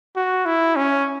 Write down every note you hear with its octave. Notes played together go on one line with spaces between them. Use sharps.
F#4
E4
C#4